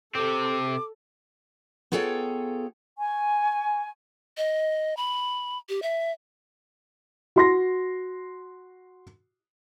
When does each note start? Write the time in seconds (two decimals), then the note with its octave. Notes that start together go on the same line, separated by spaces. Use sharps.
0.15 C3 C4 A4 D6
1.92 B3 F4 G#4 A4 C#5 G5
2.98 G#5 C#6
4.37 D#5
4.97 B5
5.69 G4
5.82 E5
7.36 F#4 C6 A#6